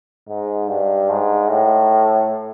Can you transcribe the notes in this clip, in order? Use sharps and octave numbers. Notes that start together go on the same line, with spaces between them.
G#2
G2
G#2
A2